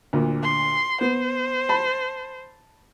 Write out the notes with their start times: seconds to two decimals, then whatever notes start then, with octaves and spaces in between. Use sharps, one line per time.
0.13 D2 A#2
0.43 C6
1.01 B3 C5
1.69 A5 B5